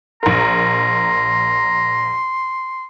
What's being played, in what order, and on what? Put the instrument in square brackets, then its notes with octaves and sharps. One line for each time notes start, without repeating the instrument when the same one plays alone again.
[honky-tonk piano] A#1 A#4 [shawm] A#5 [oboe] C6